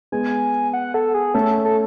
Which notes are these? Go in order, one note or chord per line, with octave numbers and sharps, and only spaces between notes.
G#3 B3 G#5
F#5
A4
G#4
A3 C#4 A4
A4